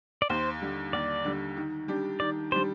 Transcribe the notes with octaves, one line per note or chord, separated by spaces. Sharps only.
D5
D#2 C5
D3 G3
D#2 D5
D3 G3
D#3
G3 D4 G4
D#3 D5
G3 D4 G4 C5